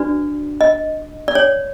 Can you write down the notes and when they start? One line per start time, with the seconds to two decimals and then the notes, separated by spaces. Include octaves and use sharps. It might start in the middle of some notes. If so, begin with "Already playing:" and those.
Already playing: D4 F#4 B4 D5
0.61 D#5
1.28 D5
1.35 C#5